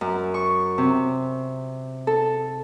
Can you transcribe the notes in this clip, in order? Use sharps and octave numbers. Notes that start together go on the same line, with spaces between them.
F#2
C#6
C3
A4